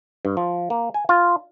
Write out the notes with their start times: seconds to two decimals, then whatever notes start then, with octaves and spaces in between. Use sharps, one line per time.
0.25 G2
0.37 F3
0.70 A#3
0.94 G#5
1.09 F4